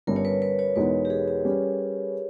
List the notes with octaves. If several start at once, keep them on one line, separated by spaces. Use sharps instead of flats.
G1 G2 G3 C#4 A#4
C#5
B4
B4
C#5
E2 B2 G#3 B3 D#4 B4
G4
G#4
G4
G3 C#4